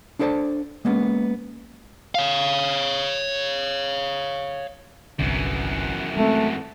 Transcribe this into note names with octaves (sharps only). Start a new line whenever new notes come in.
D4 E4 A4 C5 D5 A5
G#3 A#3 B3 C#4
C#5 F5
G1 C2 F#2 D3 E3
G#3 A3 C4